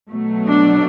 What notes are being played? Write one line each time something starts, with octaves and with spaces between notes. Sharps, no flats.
B2 F#3 A3
D4